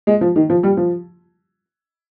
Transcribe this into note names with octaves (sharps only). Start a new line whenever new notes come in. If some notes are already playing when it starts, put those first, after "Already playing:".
G#3
F3
D#3
F3
G3
F3